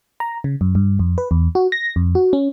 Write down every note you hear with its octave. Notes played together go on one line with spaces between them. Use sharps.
A#5
C#3
F#2
G2
F2
B4
E2
F#4
A#6
F2
F#4
C#4